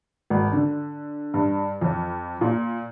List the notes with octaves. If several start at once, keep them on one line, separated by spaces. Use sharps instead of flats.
G#1
D3
G2
F2
A#2